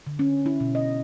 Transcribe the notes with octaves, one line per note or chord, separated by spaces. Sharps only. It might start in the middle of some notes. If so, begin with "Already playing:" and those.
D3
C#4
E4
B2
D#5